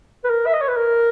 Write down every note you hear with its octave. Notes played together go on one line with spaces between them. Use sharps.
B4
A#4
E5
D#5
C#5
B4
A#4